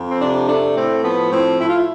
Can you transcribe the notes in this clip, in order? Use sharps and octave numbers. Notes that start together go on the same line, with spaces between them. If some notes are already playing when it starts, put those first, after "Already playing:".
Already playing: F2
C4
C3 D4
A3 D4
A2 C4
F3 B3
A2 C4
A2 E4
F4
E4